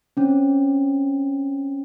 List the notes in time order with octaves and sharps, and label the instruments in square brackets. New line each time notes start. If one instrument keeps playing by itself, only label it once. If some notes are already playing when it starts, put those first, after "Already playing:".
[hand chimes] C4 C#4